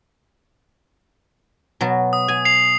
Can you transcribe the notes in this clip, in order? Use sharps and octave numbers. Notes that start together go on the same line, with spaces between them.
B2 F#3 A5
D#6
G#5
C7 F7